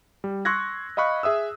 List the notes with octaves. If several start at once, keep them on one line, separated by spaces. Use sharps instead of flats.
G3
C6 C#6 E6 F#6 G#6 A#6
D#5 F5 B5 C#6 F#6
G#4 E5 D#6 E6